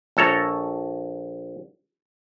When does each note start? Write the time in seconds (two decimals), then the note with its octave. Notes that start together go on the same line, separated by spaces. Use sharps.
0.17 A#1 A4 C#5 A#5